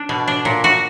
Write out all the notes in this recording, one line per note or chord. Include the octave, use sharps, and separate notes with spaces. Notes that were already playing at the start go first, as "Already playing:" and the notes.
Already playing: D4
B2
D4
A#2
F#4